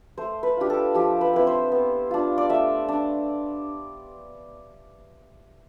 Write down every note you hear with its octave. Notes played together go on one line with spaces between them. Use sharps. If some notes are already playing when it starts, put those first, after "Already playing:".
A3 C5
B4
D4 F4 G4
A4
F3 G4
B4
C4 E4 B4
C5
B3
D4 F4
D5
A3 E5
D4